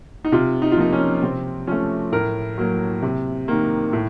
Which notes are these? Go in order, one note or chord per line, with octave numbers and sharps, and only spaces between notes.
D#4
C3 F4
D#4
F4
F3 A#3 D#4
C#4
C3 C4
F3 A3 C#4
A2 A#4
F#3 A#3
C3
D#3 A#3
A2